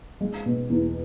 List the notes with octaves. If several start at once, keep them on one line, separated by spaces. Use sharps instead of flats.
G#3
B2
E2